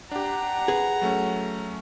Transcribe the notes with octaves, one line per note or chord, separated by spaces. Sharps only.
D4 G4 F#5 A#5
G#4 B4
F#3 A3 C#4